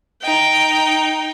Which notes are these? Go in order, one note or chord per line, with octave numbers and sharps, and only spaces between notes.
D#4 G5